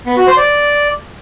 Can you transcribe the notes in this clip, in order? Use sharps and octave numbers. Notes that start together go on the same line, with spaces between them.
B3
F#4
C5
D5